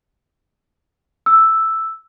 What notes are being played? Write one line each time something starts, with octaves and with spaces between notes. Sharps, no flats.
E6